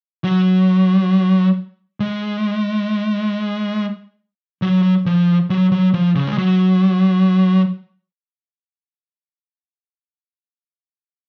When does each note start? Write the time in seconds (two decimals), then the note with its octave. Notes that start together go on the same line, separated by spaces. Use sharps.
0.24 F#3
2.00 G#3
4.62 F#3
5.06 F3
5.50 F#3
5.72 F#3
5.94 F3
6.15 C#3
6.27 G#3
6.38 F#3